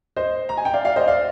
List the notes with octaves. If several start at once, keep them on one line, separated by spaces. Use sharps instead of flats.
C5 D#5
A#5
G#5
G5
D5 F5
D5 F5
C5 D#5
D5 F5